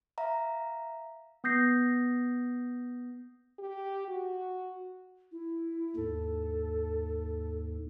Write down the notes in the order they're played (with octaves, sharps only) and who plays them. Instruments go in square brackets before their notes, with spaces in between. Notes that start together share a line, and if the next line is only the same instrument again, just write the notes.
[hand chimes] E5 F5 A#5
[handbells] B3 D#6 G6 A#6 C7
[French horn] G4
F#4
[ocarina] E4
[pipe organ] D#2 G#2 [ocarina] A4